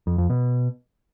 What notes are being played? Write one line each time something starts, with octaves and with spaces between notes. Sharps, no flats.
F2
F2
B2